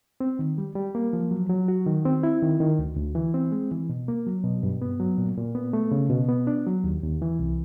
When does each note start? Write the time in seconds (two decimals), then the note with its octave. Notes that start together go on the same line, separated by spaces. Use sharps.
0.20 C4
0.39 D#3
0.58 G3
0.75 G3
0.95 A#3
1.13 F3
1.31 F#3
1.50 F#3
1.68 F#4
1.87 D#3
2.05 C4
2.23 E4
2.42 D#3
2.60 D#3
2.79 D2
2.97 D2
3.15 E3
3.34 C4
3.52 G#3
3.72 E3
3.89 B2
4.08 A#3
4.27 F#3
4.44 B2
4.63 G2
4.82 B3
5.00 F#3
5.18 A#2
5.37 A#2
5.55 B3
5.73 A3
5.92 C#3
6.10 B2
6.28 B3
6.47 D4
6.66 F#3
6.84 D#2
7.03 D#2
7.22 E3
7.39 C2